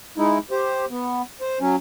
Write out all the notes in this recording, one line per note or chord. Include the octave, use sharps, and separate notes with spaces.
G#3 D#4 E4
G4 C5
B3
C5
F#3 C#4